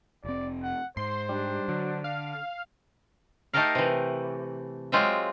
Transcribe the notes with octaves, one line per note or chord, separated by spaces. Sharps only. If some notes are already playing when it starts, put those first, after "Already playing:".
F1 C4 D5
F#5
G#2 C5 C6
G3 D4
D3 F#3
F5
A3 D#4 G4 A4 A#4 F5
C3 E3
F#3 G#3 C4 F4 G4 E5